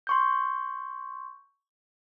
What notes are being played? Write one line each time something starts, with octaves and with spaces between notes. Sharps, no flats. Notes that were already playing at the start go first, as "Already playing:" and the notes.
C6 C#6 G6